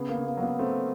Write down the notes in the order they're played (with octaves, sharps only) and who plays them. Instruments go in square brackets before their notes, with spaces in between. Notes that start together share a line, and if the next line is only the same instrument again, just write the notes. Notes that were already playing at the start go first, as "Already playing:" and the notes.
Already playing: [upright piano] C#3 [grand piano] B3
[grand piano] A#3
[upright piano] C#3
[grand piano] A#3
[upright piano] F#3 [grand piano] A#3
[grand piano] B3
[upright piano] A3 [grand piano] C4